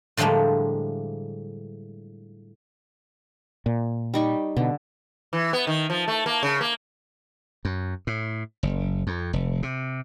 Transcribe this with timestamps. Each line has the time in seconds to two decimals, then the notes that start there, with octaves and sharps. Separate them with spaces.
0.17 A2 D3 F3 G3 G#3 A#3
3.66 A#2
4.14 G3 D#4 C#6
4.57 B2 D3
5.33 E3
5.53 B3
5.67 D#3
5.90 F3
6.08 A3
6.26 A#3
6.43 C#3
6.61 A#3
7.65 F#2
8.07 A2
8.63 F#1
9.07 F2
9.33 F1
9.63 C3